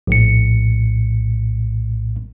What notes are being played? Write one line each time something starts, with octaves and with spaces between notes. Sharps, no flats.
A#1 A2 C#7